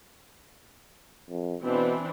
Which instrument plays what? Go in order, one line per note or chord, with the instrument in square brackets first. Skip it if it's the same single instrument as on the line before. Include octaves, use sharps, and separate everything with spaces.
[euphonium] F2
[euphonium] B2 [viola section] E3 C4 D4